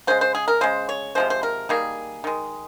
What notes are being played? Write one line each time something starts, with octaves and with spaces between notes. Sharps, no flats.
C#3 G#3 C5
C5
G#4
A#4
C#3 G#3 C5
C#5
C3 F3 G#3 C5
C5
A#4
D#3 G3 A#3 G#4
D#3 G#3